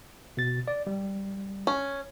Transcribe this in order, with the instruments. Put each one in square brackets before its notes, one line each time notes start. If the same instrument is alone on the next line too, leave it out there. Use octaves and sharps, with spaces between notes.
[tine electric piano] B2 A6
D5
G3
[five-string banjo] C#4